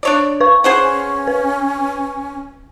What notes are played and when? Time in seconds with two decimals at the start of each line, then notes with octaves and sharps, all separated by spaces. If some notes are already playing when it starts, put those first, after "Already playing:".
0.03 D4 C#5 D5
0.41 B4 C#6
0.64 C#4 G#4 C5 F#5
1.27 B4